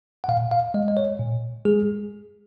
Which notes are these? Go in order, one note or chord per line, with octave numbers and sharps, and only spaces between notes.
F#5
A#2 F5
F5
G#3 D#5
D#5
C#5
A#2
G#3 G#4